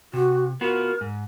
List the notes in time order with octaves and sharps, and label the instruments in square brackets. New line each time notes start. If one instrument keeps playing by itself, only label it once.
[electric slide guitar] C3 [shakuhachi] F#4
[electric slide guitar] B3 F4 F#4 [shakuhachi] A#4
[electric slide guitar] G#2